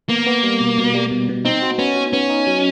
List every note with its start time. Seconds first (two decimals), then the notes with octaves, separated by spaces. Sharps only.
0.09 A#3 B3
0.26 B3
0.43 G3
0.61 B2
0.78 B2
0.94 G3
1.11 B2
1.29 B2
1.45 C4 D#4
1.62 F#4
1.79 B3 C#4
1.96 F#4
2.13 B3 C#4
2.30 D#4
2.47 F#3